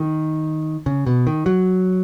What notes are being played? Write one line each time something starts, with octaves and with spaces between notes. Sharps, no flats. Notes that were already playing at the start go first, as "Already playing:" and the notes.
Already playing: D#3
C#3
B2
D#3
F#3